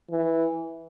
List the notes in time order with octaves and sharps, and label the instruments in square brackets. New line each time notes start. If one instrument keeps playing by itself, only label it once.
[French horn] E3